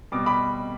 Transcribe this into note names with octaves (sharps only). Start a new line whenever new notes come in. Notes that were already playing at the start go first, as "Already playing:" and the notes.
B2 G3 D6
B5 D6